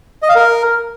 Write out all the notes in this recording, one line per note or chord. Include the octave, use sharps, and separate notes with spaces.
D#5
F5
A#4